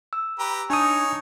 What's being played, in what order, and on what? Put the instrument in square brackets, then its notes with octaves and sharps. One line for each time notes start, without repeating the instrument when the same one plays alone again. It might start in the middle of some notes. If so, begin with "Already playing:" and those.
[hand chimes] E6
[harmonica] G4 B4 A#5
[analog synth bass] D4 [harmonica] D#4 C#5 [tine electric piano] G#5 A5 D#6